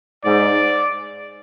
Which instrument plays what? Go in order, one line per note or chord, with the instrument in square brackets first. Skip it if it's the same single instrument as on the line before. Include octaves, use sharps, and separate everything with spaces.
[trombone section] G#2 [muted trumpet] D5